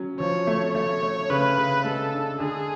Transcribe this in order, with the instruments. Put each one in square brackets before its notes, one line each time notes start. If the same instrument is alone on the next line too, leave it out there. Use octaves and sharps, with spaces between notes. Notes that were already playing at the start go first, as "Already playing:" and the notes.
Already playing: [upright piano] F#3 C#4
[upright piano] F3 [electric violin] C#5
[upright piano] A3
[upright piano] A3 [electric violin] C#5
[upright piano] A3
[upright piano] C#3 [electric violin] B4
[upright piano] C#3
[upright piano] G#3 [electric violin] A4
[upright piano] D4
[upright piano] D3 [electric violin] G#4